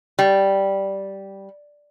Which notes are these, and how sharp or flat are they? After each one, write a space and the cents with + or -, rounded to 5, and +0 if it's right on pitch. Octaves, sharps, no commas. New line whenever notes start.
G3 -5